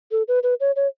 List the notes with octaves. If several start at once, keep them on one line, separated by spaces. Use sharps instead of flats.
A4
B4
B4
C#5
C#5